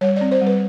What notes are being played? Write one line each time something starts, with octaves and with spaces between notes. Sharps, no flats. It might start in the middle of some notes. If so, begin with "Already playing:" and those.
G3 C#5
D5
C4
C5
G3
B4